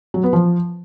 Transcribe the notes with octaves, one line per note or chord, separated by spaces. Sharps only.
F#3
B3
F3